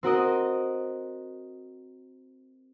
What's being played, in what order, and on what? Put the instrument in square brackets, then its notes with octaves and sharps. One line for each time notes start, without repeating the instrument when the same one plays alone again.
[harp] C4 F#4 A#4 D#5